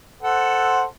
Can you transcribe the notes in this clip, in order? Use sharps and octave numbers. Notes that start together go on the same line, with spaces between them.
A4 C5 F#5